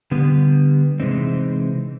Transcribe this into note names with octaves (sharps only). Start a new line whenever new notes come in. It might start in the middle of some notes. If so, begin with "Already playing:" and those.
D3 G3 B3
C3 E3 G#3 C4 D#4